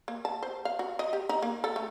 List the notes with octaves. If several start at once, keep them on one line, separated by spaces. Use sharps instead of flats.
A#3
A5
C5
F5
F#4
D#5
G4
D#4
A#3
A4
A3